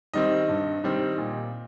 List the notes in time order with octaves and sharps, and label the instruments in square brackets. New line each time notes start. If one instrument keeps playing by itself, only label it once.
[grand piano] D#3 G3 C4 D#5
G2
D#3 G3 C4
A#2